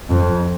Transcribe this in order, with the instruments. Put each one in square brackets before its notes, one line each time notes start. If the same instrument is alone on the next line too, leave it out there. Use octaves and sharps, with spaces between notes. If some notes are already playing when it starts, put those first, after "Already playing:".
[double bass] F2